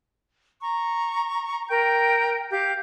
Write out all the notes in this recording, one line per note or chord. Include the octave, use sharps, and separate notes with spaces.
A#5 C#6
A#4 G5 G6
G4 F5 G6